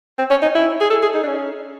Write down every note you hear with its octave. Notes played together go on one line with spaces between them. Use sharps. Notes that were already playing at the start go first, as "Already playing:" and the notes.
C4
C#4
D#4
E4
G#4
A4
G#4
D#4
D4
C#4